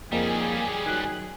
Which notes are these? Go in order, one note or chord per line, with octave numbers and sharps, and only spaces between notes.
F2 F3 G3 A#3 C#4 D#4 G#4
D#3 F#3 F#6